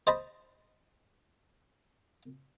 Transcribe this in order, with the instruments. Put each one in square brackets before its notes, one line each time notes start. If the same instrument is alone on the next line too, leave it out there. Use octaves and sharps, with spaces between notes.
[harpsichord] C5 D#5 A5 B5